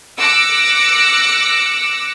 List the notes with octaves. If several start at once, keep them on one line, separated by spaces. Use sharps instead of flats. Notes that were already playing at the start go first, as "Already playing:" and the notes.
D6 E6 F#6 A#6 C#7